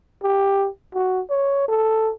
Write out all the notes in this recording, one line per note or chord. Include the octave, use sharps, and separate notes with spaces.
G4
F#4
C#5
A4